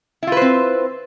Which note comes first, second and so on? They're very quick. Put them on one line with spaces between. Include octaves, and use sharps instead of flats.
E4 F4 B4 C5 C4